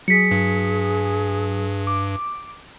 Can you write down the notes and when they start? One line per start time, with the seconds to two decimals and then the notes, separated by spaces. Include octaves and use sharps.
0.08 F#3 G#4 B6 C#7
0.31 G2
1.87 D6